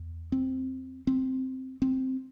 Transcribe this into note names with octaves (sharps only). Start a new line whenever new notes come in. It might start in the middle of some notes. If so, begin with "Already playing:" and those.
Already playing: E2
C4
C4
C4